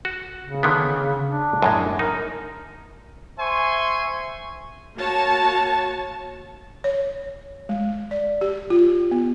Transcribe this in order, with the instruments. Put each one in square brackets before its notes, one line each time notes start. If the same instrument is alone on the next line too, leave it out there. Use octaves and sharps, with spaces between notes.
[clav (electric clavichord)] F#4
[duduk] C#3
[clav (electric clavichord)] D3 D#3 B3
[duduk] D4
[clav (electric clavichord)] F#2 A2 G#3
[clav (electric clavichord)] D#4 [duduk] A#4
[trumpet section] C5 E5 G#5 C6 C#6
[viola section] A#3 F#4 C#5 A5
[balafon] C#5
G#3
D5
G4
F4
B3